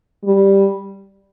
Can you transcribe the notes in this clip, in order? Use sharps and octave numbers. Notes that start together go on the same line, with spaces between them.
G3